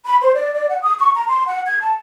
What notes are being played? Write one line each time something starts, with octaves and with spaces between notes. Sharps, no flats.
B5
C5
D5
D5
F#5
D#6
C#6
A#5
C6
F#5
G#6
A5